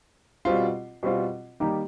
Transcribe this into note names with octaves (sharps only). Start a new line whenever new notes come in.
B2 G3 C4 F4
B2 G3 C4 F4
D#3 G3 A#3 D#4 G4